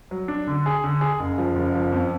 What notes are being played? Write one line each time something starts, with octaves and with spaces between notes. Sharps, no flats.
F#3
D4
D3
G#4
D3
G#4
F#1
F3
F#1
F3
F2